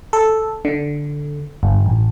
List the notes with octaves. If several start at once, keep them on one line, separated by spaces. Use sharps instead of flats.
A4
D3
G1
A1